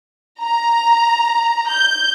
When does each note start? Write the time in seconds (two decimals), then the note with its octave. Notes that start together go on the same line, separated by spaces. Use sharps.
0.41 A#5
1.69 G6